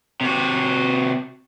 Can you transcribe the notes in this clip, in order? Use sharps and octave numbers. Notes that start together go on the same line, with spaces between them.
C3 F#4